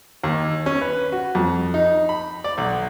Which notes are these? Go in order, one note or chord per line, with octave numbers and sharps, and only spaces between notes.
D#2
C#4
B4
F#4
F2
D#4
B5
D5
B1